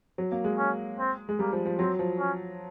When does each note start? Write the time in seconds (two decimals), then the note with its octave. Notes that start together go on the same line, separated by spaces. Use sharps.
0.18 F#3
0.32 A#3
0.44 G#3
0.58 C#4
0.99 C4
1.29 G#3
1.39 G3 A#3
1.52 F3
1.66 F3
1.79 F#3 C4
1.99 F3
2.19 C#4